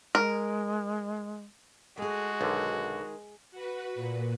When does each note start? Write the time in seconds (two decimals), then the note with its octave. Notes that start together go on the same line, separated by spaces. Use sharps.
0.15 G#3 A#4
1.98 G#3 A3 F#4 G#4
2.41 B1 D3 D#3
3.51 F#4 B4
3.95 A#2